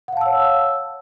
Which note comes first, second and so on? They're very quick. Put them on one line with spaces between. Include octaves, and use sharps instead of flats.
F#5 F5 A5 E6 C#5